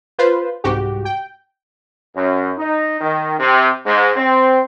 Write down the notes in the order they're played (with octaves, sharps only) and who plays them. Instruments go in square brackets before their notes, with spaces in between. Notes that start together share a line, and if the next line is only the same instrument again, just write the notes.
[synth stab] F4 B4 C5
C2 G#2 F#4 G4
G5
[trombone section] F#2
D#4
D#3
C3
G#2
C4